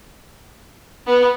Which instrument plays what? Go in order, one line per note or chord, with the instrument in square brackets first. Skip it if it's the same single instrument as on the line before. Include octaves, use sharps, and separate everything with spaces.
[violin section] B3